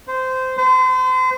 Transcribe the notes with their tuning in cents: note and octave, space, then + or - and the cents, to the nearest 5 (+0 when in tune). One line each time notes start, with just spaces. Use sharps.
C5 -15
C5 -35